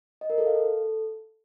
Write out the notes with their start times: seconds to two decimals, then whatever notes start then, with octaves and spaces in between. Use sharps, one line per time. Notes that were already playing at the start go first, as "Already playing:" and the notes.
0.21 D#5
0.30 A#4
0.38 A4
0.46 F5
0.55 A4